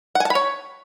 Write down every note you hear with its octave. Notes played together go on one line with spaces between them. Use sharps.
C#5 F#5 G#5 A5 B5